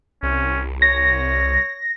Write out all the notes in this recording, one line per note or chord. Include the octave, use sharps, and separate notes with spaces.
C2 C#4
C#5 A#6